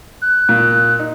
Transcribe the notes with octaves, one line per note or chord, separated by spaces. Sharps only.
F#6
A#2
D#4